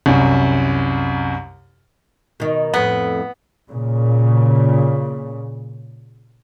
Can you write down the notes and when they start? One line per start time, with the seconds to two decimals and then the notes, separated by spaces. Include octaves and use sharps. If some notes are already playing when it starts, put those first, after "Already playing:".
0.06 C2 F#2
2.40 B2 D#3
2.74 F2 A2 B3
3.72 A#2 C#3